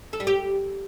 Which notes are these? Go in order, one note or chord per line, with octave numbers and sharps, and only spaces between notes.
A4
G3
G4